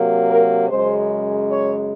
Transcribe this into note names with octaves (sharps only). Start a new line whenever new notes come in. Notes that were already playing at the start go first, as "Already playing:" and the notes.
Already playing: C3 F#3 A#3
A#4
F#2 C#3 G#3 C5
C#5